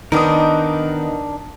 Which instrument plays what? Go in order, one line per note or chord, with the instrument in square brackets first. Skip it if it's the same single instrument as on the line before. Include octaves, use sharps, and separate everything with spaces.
[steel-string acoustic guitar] D#3 B3 [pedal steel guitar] D4 A#4 [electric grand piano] D#4 B4 D#6